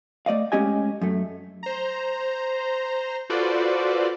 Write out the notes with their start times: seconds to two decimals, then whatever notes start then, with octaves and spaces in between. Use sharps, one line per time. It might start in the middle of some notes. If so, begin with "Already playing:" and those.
0.26 A3 D5 D#5 F5
0.52 G#3 A3 C#4 G4 D#5 G#5
1.02 F#2 A3
1.63 C5 A#5
3.30 F4 F#4 A4 B4 C5 D5